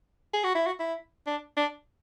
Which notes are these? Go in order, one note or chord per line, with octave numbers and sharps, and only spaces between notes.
G#4
F#4
E4
F#4
E4
D4
D4